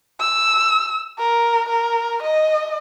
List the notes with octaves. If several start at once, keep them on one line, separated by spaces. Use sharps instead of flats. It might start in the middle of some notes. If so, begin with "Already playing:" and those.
E6
A#4
A#4
D#5